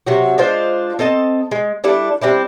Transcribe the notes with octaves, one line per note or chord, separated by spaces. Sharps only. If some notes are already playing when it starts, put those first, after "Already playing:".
C3 F#3 F#4
G#3 D4 F4 C5
C4 A4 D#5 A5
G#3
G3 D4 E4 A4
G3 C4 D4 E4